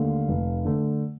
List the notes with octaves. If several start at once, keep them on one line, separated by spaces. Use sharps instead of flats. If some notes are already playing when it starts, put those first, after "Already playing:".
Already playing: D#2 D3 A3 F5
F1
D3 A3